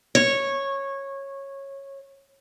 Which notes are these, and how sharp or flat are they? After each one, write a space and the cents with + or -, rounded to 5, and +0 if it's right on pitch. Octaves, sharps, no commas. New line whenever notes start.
C#5 -15